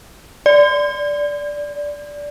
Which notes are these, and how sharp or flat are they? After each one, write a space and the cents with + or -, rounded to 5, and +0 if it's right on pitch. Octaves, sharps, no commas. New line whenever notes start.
D5 -10